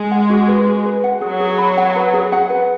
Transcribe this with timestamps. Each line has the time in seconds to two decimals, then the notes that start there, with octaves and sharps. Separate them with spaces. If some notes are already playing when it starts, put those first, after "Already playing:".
Already playing: G#3
0.11 F#5
0.30 F#4
0.48 B4
0.66 F#4
0.85 B4
1.04 F#5
1.21 F#3 G#4
1.40 G#4
1.58 B5
1.77 F#5
1.96 B4
2.14 G#4
2.32 F#5
2.50 B4